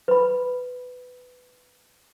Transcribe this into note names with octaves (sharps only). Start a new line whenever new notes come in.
B4 B5